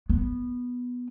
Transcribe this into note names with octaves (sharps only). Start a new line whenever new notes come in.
B3